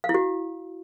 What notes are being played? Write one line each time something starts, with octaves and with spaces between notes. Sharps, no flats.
F5
E4
F#4